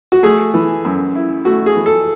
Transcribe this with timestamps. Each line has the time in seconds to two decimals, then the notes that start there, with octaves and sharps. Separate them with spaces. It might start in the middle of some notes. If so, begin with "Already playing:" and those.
0.12 F#4
0.23 A3 G#4
0.54 E3
0.85 F#2
1.15 E4
1.45 A3 F#4
1.66 G#4
1.76 E3
1.86 A4